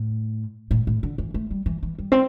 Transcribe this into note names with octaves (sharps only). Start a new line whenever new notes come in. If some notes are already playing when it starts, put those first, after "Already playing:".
Already playing: A2
A2
A2
D3
E3
A3
G3
E3
E3
G3
C4